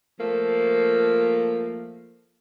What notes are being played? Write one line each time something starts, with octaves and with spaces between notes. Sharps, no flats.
F3 A3 A#3